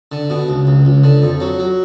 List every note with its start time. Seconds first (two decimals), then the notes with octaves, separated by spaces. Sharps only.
0.12 D3
0.30 B2
0.49 C#2
0.67 C#2
0.85 C#2
1.04 D3
1.22 F2
1.40 F#3
1.59 F#3